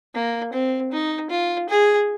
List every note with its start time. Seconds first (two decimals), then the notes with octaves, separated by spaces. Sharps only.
0.15 A#3
0.53 C4
0.92 D#4
1.30 F4
1.69 G#4